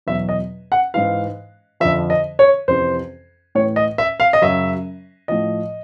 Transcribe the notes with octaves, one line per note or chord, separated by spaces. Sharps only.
E2 B2 F#3 E5
D#5
F#5
G#2 E3 F5
F2 D3 F3 E5
D#5
C#5
F2 C3 E3 C5
A2 E3 C#5
D#5
E5
F5
D#5
F#2 C#3 F#3 E5
A2 F3 D#5